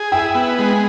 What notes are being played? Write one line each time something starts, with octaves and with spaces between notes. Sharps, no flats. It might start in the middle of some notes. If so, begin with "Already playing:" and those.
Already playing: G#4
E4 G5
B3
G#3